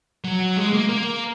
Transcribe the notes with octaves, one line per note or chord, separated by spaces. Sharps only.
F#3
G#3
A#3
A#3